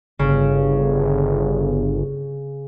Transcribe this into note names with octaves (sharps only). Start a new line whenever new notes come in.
G1 C#3